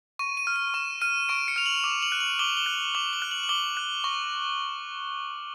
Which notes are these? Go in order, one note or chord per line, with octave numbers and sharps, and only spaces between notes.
C#6 D#7
D#7
F6
D#7
C#6 E7
F6 D#7
C#6 D7
C#7
F6 F7
F#7
D6
F#7
F#6
F#7
D6 G7
G7
F#6
D6 F#7
G7
F#6
F#7
F#7
D6 G7
F#6
C#6